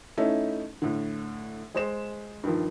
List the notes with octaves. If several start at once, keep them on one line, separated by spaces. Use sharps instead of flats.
A3 C#4 D#4 E4
A2 D3
G#3 C5 E7
G2 D#3 F3